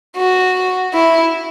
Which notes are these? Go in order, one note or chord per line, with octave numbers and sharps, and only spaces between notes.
F#4
E4